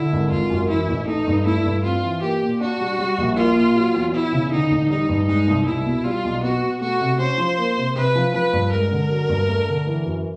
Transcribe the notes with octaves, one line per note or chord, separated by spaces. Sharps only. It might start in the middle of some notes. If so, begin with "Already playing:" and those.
Already playing: D3 E4
G#1
G#1 F4
F#2
E3 E4
A1
A3 D#4
G2
A3 E4
G2
C4 F4
E3
A#3 G4
A#2
D4 F#4
G3
G3
A#1
A#3 F4
A#2
F#3
E2
E2 E4
C#3
D3 D#4
A1
G3 D#4
G2
G#3 D#4
C2
C2 E4
B2
G3 F4
B1
B3 F#4
B2
A3 F#4
C3
C#4 C5
F3
A#3
C3
C3 B4
F3
F3 B4
G2
G#3 A#4
D3
F#3
G2
A3
D3
E3
F#2